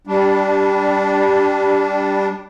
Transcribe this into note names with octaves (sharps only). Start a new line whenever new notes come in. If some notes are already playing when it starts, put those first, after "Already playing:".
G3 D4